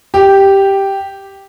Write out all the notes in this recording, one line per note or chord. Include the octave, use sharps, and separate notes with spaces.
G4